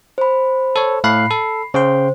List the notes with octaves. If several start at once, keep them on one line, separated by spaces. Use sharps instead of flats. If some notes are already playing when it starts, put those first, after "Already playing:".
C5 B5
A4 C#5
A2 F5 B5 F#6 C7
A4
C#3 C5 G5 C6